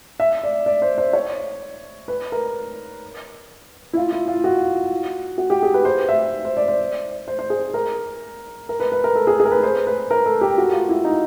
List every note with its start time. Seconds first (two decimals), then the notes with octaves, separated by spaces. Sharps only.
0.20 E5
0.43 D5
0.66 D5
0.82 C5
0.98 C5
1.13 C#5
2.08 B4
2.32 A#4
3.93 E4
3.97 F4
4.13 E4
4.28 F4
4.44 F#4
5.38 F#4
5.50 G4
5.63 G#4
5.74 B4
5.85 C5
6.09 E5
6.45 C5
6.57 D5
6.68 C5
7.28 C5
7.39 C5
7.50 G#4
7.74 A#4
8.69 A#4
8.80 B4
8.92 B4
9.04 A#4
9.15 A4
9.27 G#4
9.40 G#4
9.45 A#4
9.51 B4
9.63 C5
9.87 B4
10.11 A#4
10.26 A4
10.41 G4
10.58 F#4
10.73 F4
10.89 E4
11.05 D#4